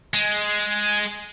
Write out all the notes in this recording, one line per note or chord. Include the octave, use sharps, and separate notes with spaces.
G#3